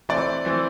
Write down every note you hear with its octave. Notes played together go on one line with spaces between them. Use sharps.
E3 A3 C4 D5
E3 A3 C4